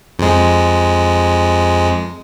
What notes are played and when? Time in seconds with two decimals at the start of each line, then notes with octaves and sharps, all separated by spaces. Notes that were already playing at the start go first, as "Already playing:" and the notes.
0.19 F2 G#3